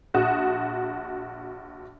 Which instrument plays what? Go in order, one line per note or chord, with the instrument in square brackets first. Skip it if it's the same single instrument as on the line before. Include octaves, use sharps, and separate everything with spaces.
[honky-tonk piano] A#1 F#4 D#6